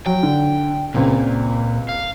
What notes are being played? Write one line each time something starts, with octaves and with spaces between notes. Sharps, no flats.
F#3 G5
D3
C#2 A#2 C4
F5